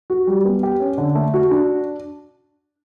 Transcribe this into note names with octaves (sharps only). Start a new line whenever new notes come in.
F#4
G3
B3
G4
C#4
D3
A3
F#4
D4